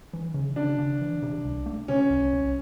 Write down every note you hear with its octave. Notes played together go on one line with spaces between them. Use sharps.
E3
C#3
C#3 D4
C#3
E3
C3
C2
A3
C3 C#4
C2
C2